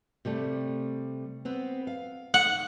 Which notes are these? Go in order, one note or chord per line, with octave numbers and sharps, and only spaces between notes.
C3 G3 A3
B3 C4 B4
F5
F#5